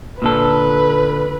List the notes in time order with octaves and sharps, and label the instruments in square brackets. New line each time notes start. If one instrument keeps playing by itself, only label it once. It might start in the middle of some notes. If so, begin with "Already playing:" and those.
[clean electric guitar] A#2 D3 A4 [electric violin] B4